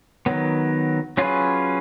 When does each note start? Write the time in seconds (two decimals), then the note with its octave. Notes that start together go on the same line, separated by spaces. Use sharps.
0.26 D#3 F#3 B3
1.17 F#3 C#4 F4 G#4 B4